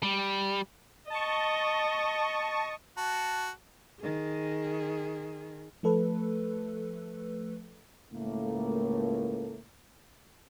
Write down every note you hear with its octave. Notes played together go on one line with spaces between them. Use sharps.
G3
D#5 A5 C#6
F#4 A5
D#3 G#4
F3 A3 A4 B4
C#2 A2 A3 A#3